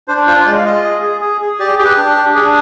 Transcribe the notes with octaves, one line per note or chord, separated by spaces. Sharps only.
D4 C5
F4 C5
G#3 D5
F5
F4 D#5
G#4
G#4
G#4
G#4
G4 D5
G4 G#4
B4
D4
D4
D4 G#4